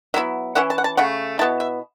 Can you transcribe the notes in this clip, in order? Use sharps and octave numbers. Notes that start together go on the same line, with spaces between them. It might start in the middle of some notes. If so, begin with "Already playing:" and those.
F#3 B3 E4 E5
E3 C#4 E4 F#5
A5
F#5
A5
C#3 A3 F#5
B2 B3 E4 A5
E5